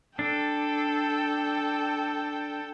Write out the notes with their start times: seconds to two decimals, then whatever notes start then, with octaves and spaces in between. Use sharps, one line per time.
0.19 D4 A4 G5